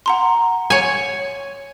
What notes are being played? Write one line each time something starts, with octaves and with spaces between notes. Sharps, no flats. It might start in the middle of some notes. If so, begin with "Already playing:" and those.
F#5 A#5 C6
C#5 G#5